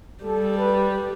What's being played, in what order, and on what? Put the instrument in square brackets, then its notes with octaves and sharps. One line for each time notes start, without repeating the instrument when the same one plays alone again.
[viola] G3 [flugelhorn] A4
[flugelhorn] B4